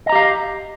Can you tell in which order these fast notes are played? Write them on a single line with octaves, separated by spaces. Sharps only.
D#5 A#5 G4 F5